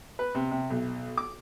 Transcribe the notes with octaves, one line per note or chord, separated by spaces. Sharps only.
B4
C3
C3
B1
D6